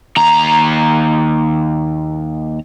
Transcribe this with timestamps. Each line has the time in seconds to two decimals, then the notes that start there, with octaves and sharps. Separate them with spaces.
0.17 D#2 A#5